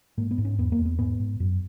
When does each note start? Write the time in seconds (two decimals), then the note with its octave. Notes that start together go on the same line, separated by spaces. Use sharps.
0.17 G#2 A#3
0.31 B3
0.38 G#2
0.45 C#4
0.58 E2 B3
0.72 A#3
0.79 E2
0.85 B3
0.99 G#2 B3
1.20 G#2
1.40 F#2